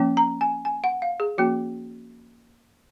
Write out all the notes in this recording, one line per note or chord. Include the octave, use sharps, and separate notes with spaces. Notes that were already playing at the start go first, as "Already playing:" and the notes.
Already playing: F3 A#3 C#4
A#5
G#5
G#5
F#5
F5
G#4
F3 A#3 C#4 F#4